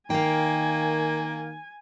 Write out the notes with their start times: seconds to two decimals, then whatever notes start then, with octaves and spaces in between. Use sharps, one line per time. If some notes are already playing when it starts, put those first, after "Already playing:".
0.10 D#3 A#3 F5 G5 G#5